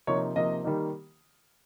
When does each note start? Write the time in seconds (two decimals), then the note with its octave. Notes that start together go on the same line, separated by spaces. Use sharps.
0.07 C3 F3 A#3 D#4 C#5
0.35 C3 F3 A#3 D#4 D#5
0.64 D#3 G3 A#3 D#4